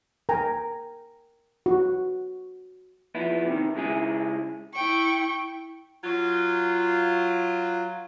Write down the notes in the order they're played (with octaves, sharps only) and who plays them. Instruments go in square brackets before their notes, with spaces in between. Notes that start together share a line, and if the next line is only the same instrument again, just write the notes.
[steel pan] A#4 G5 G#5 A#5
F#4
[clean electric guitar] F3 B3 E4
C3 D#3
C#3 G#3 E4 G#4
[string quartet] E4 G5 C#6
[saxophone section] F#3 F4